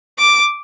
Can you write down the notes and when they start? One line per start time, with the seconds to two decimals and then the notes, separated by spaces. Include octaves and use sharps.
0.18 D6